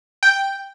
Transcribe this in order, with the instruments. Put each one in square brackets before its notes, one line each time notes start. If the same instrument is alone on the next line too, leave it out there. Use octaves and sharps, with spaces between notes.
[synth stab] G5